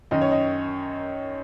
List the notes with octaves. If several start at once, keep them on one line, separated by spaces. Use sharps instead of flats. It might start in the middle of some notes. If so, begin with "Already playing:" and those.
F#2 D#3 D#5
C#5
D#5